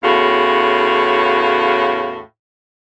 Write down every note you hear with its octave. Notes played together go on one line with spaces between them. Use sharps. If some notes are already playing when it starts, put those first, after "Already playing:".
E2 A2 C#3 F#4 F5